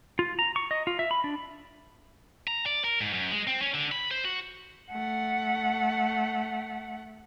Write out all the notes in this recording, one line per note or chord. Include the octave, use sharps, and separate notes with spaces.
F4
A#5
C#6
D#5
F4
E5
B5
D4
A#5
D5
A#4
G#2
F#2
G#3
C4
C#4
D3
B5
C5
F#4
A3 F#5